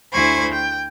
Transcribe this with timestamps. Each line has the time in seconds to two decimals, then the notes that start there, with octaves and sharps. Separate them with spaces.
0.12 D2 E4 C5 G#5 B5 C#6
0.51 G5